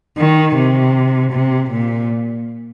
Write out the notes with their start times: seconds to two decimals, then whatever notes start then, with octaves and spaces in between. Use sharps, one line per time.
0.17 D#3
0.56 C3
1.32 C3
1.71 A#2